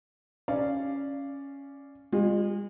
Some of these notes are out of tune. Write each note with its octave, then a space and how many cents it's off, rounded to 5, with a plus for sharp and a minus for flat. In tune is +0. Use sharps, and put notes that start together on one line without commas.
C#4 +0 D5 +0 F5 -15
G#3 -40 F4 +15